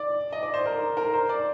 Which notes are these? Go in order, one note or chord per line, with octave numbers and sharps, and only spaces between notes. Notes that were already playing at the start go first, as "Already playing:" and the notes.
Already playing: D5
D#5
D5
C5
A#4
A#4
C5
D5